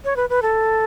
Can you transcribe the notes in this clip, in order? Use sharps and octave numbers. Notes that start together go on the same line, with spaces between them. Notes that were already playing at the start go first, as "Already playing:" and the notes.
C#5
B4
B4
A4